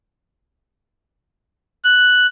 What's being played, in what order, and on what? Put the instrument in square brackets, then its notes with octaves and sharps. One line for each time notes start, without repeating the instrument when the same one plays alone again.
[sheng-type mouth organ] F#6